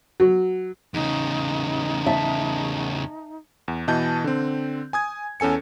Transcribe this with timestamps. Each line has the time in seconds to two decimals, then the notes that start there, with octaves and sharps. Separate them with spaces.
0.20 F#3
0.94 E2 C#3 D#4
2.06 E5 A5
3.68 E2
3.88 B2 E3 D#5 A5 G6
4.24 D3 C4
4.93 G#5 D#6 G#6
5.40 E2 C#4 A4 G#5 C#7